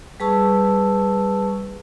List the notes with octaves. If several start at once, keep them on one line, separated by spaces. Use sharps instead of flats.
G3 G#4 B4 A5 C#6 E6